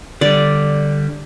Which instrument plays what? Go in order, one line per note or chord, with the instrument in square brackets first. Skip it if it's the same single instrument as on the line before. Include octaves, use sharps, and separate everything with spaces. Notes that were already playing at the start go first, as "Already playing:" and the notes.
[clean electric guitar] D3 G3 [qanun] D5